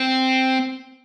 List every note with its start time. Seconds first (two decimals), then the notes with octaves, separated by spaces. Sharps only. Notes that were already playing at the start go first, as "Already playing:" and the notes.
Already playing: C4